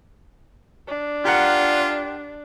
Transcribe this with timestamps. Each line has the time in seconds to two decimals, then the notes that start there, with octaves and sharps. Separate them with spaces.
0.87 D4
1.25 F4 G4 A#4 F#5